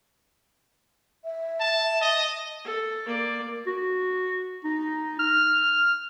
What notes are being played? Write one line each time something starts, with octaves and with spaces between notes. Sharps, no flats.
E5
A5
D#5
A4
A#3 D5
F#4
D#4
F6